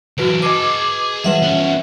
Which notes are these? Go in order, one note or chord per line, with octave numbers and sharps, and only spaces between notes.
E3 F#3 F#4 B4 D7
G#4 B4 D#5 A5 D6
E3 G3 B4 E5 F#5
B3 C#4